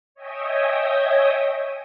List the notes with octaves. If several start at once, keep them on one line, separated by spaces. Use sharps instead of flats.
C#5 D#5 E5 G5 G#5 D#6